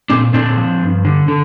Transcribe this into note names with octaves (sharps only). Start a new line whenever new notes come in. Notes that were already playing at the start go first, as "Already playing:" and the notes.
A#2 C4 D4
A#2 C4 D4
F3
G2
D3
D3